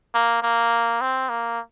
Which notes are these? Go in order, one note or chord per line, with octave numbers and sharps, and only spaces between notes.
A#3
A#3
C4
A#3